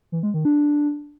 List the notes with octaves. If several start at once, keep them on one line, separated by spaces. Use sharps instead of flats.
E3
G#3
D#3
D4